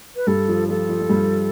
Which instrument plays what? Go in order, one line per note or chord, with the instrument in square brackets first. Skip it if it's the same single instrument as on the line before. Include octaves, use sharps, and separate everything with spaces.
[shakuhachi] B4
[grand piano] G2 G3 [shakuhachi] A4
[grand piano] F3
[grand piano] F3 [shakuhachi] A4
[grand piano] F3
F3
G2 G3